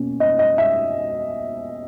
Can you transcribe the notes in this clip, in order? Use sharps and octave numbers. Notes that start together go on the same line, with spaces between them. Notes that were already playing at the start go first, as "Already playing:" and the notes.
Already playing: B2 A#3 C#4
D#5
D#5
E5